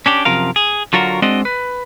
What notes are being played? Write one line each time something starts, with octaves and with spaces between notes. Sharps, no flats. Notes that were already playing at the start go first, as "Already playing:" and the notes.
C#4 D4 G4
F#2 C3 F3 A#4 F5
G#4
D3 F#3 F4 F#4 A#4
G#3 C4 D4 F#4 D5 D#5
B4